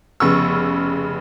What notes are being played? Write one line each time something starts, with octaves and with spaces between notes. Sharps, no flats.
F1 C#3 B3 C#6 E6